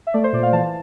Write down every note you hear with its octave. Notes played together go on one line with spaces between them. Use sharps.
E5
A3 D5
C5
A#2 D5
F5
E3 A5